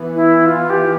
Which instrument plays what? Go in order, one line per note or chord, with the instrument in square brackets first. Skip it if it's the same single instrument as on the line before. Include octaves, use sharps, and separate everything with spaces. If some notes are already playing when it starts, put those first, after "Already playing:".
Already playing: [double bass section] E3 B3
[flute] E4
F4
G4